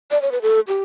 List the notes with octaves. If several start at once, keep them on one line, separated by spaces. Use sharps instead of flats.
D5
C#5
B4
A4
G4